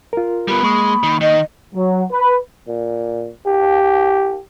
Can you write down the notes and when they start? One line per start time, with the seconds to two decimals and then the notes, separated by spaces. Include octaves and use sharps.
0.13 F4 A#4
0.48 G3 B3 B5
0.63 G#3 A#3 C#6 D#6
1.03 D#3
1.21 D#3 D#5
1.75 F#3
2.11 B4
2.68 A#2
3.46 G4